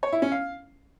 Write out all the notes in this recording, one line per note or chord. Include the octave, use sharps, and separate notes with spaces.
C#5
E4
C#4
F5